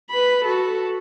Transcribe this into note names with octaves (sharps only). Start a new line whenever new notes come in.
B4 B5
F#4 A4